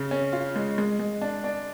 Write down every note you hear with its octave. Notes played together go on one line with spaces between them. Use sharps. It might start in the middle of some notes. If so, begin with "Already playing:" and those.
Already playing: C#3
C#4
F4
G#3
G#3
G#3
D4
D4